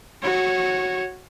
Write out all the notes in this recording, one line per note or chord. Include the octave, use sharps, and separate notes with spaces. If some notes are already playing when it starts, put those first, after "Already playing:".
F#4 C#5